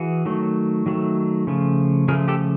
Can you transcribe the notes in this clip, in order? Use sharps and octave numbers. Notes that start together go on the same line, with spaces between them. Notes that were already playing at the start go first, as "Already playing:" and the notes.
Already playing: E3 F#4 G#4
D#3 F#3 A3
D#3 F#3 A3
C#3 F3 A3
C#3 F3 A3 G#4 A#4
G4 A4